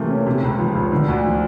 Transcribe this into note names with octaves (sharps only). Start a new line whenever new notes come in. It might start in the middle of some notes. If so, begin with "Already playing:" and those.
Already playing: C3 E3 A3 A#3
C#4
C3
C#2
F3
C#2
D3
D2
F3